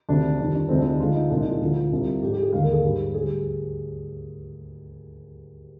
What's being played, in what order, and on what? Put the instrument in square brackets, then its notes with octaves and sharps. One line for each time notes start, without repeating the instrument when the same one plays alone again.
[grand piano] D2 C3 D#3 D4
F2 C3 D#3 G3 D4
D4
D2 C3 F3 G#3 C4
D4
D#4
D2 D3 F3 G#3 F4
D#4
C2 A#2 F3 G#3 D4
D#4
F4
D2 D3 F3 F4
C2 C3 G3
G#2 F3 G#3 G4
G4
G#4
D#2 D3 G#3 F5
A#4
G#4
G#2 G3
D2 D3 G3 G#4